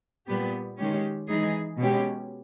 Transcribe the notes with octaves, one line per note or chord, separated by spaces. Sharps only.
A#2 G3 B3 G4
D#3 G#3 C#4 G4
E3 G#3 D#4 G#4
B2 G#3 C#4 G4